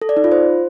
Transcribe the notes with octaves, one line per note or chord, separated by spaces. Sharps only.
A4
D5
D#4
F4
C5